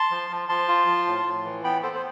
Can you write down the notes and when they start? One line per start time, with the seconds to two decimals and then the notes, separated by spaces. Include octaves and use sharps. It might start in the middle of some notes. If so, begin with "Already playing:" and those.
Already playing: A5 C6
0.11 F3
0.30 F3
0.49 F3 A5 C6
0.68 F4
0.87 F3
1.07 A2
1.25 A2
1.45 E3
1.64 B3 G5 B5
1.83 B3 A4 C5
1.95 C5